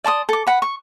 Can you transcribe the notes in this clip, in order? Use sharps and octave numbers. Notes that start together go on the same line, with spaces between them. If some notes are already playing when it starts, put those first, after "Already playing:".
D5 A5 C6 D#6
A4 D6
B4 F#5 B5
C#6